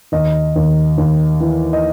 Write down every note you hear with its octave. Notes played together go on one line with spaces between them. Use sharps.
D#2 D#5
D#2
D#2
E3
D#5